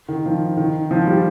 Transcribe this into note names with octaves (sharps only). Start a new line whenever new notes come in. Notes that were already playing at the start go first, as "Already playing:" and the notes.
D#3
F3
D#3
F3
G3